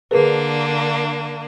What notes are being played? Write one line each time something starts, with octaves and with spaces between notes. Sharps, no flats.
D3 A#3 D4 G#4 A#4 B4